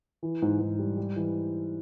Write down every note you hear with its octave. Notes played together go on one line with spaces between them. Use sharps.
E3
G#2
G#2
G3
G3
E3